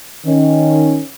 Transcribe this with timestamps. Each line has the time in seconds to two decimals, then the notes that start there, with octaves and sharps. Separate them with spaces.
0.25 D#3 C#4